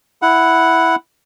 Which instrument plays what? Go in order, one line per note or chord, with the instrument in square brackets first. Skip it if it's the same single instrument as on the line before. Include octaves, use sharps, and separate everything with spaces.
[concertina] E4 F#5